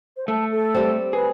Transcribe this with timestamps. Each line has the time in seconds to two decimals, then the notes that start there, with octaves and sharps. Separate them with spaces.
0.17 C5
0.28 A3 A5
0.52 A4
0.75 G3 C4
1.13 G#4 B4